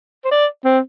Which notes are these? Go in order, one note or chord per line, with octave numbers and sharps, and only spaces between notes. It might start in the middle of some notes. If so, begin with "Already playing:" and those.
C5
D5
C4